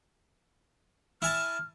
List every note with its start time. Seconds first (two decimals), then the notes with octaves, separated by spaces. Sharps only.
1.22 E4 G#5 A5 F6